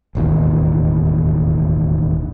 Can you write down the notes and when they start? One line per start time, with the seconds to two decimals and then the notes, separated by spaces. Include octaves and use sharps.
0.15 E1 A1 D#2